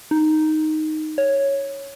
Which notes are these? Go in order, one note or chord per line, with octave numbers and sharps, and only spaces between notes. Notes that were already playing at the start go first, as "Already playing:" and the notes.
D#4
C#5